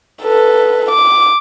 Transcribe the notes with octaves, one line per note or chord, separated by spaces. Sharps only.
A4 B4
D6